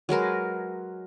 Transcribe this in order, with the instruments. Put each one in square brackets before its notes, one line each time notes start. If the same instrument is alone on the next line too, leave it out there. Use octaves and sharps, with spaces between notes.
[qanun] F#3 G#3 A#4 B4